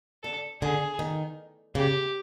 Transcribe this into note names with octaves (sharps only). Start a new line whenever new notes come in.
D3 A4
D3 G#4
D#3
C#3 G4